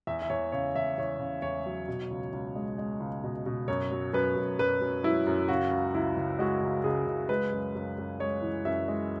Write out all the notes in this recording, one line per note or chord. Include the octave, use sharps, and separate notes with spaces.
E2 E5
E5
E2 C#5
C#3 C#5
E2 E5
E2 C#5
C#3
E2 C#5
F#3
B2
C#2
C#2
G#3
G#3
C#2
B2
B2
F#2 C#5
F#3
F#2 B4
F#2
F#2 B4
F#2
F#3 E4
F#2
C#3 F#4
C#2
C#2 E4
C#2
G#3 F#4
C#2
C#2 G#4
C#2
G#3 B4
F#2
F#2
F#2
G#3 C#5
E3
F#2 E5
G#3